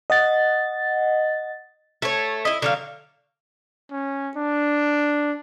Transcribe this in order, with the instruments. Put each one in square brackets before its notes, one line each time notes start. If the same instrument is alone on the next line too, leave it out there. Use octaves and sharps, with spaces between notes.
[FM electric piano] D#5 F#5 A6
[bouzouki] A3 C#5
E4 D#5
D3 F#3 F5
[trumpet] C#4
D4